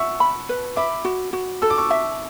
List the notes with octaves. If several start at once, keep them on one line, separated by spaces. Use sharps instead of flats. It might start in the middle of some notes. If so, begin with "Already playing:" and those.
Already playing: E5 F#5 C#6 E6
B5
B4
E5 B5 D6
F#4
F#4
A4 E6
D6
C#6 E6
E5